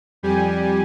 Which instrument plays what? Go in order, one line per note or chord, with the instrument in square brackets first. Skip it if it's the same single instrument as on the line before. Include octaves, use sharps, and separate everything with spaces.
[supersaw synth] F2 G3 G4 G#5